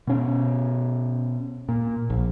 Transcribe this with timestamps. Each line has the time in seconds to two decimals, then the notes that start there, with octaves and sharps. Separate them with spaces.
0.07 B2 C#4
1.69 A#2
2.10 A#1